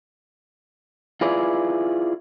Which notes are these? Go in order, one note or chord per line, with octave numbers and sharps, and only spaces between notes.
E4 F4 G#4 B4 D5